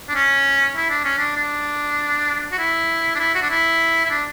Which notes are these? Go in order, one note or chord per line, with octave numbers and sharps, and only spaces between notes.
D4
C#4
E4
D4
C#4
D4
D4
F#4
E4
D4
E4
F#4
D4
E4
E4
D4